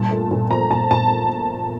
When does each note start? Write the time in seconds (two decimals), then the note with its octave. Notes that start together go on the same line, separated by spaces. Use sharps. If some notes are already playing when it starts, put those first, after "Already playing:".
Already playing: G2 A#2 A5
0.11 A3
0.31 A#2
0.51 F3 A#5
0.70 A#2 A5
0.91 A#2 A5